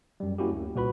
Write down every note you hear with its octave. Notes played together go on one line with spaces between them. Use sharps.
F#2 G3
A#3 C#4 E4 F#4 G4
D2
C2 A#2 F#4 B4 B5